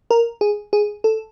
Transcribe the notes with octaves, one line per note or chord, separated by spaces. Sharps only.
A#4
G#4
G#4
A4